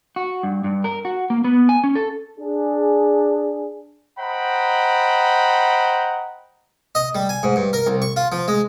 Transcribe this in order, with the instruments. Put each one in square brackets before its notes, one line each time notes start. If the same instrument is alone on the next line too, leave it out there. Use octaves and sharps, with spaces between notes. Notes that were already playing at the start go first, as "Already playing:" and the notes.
[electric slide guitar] F#4
G2
G2
A#4
F#4
A#3
B3
G#5
C#4
A4
[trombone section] D4 G#4
[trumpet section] C5 D#5 F#5 G5 A#5 B5
[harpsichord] D#5
G3
G#5
G#2
G2
A#4
C2
C#6
F4
F3
G#3